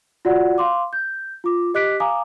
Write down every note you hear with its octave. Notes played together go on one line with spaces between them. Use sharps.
F4 F#4 D5 F#5
F5 C6 D6
G6
F4 D6
G4 D#5 D6 F#6 B6 D7
F5 G#5 A#5 D6 D#6